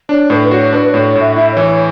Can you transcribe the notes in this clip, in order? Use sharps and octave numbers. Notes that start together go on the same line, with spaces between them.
D4 C#5
A2 B4
F#4 C#5
D4 B4
A2 C#5
C#5
A2
E5
E4 E5
E3 C#5
C#5